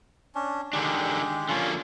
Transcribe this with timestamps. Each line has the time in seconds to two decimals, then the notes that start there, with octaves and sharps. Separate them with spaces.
0.35 C#4 D4
0.73 D3 D#3 G#3 D4 G4
1.49 D3 F3 A#3 C#4 F4